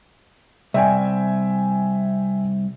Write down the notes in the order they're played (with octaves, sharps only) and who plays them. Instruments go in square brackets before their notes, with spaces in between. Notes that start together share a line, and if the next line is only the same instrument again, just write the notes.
[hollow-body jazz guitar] C2 [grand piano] E5 G5 G#5